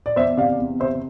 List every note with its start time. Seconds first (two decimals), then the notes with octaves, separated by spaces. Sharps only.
0.06 D5
0.16 E2 C5 E5
0.37 C3 D5 F5
0.59 E2
0.80 C3 C5 E5